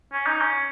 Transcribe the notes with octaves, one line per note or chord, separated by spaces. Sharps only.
C#4
D#4
C#4